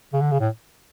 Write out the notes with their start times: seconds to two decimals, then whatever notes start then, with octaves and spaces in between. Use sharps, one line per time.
0.13 C#3
0.21 D3
0.32 C#3
0.40 A2